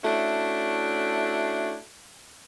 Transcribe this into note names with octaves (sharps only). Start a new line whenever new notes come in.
A3 C#4 D4 E4 F#4